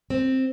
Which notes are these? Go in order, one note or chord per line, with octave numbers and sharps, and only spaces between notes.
C4